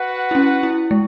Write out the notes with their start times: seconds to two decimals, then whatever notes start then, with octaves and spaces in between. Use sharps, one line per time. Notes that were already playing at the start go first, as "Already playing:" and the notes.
Already playing: F#4 B4 F#5
0.31 E4
0.35 C#4
0.63 E4
0.91 G#3